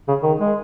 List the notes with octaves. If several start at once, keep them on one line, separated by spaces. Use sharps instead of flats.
C#3
D#3
G#3